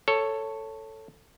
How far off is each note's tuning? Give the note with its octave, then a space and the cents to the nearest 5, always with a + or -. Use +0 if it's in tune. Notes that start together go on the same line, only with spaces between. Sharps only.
A4 +10 C#5 +0